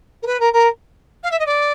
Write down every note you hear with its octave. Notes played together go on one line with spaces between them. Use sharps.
A#4
B4
A#4
A#4
F5
E5
D#5
D5